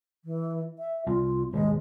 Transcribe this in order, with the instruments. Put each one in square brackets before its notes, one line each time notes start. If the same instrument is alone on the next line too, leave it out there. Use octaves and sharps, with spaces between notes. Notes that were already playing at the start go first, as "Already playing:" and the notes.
[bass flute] E3
E5
[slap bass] C2 [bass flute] F4
[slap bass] D#1 G#1 B2 [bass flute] G#3